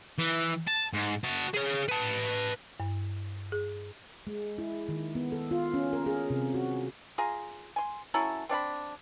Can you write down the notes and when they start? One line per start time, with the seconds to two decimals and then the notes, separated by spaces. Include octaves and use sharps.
0.18 E3
0.68 A5
0.94 G#2
1.24 F#4 A5
1.54 G#4 C#5
1.88 B4 A5
2.80 G2
3.52 G#4
4.27 G#3
4.58 E4
4.89 D#3
5.15 B3
5.32 A4
5.51 F4
5.74 C#4
5.93 A#4
6.06 G#4
6.30 C3
6.54 F#4
7.18 F4 G#4 A#5
7.76 G#5 C6
8.14 F#3 C#4 E4 A4
8.49 C4 D4 F5 B5